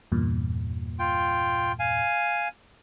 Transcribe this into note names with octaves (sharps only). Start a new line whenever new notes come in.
E2 G2 A#2
F4 G5
F5 G#5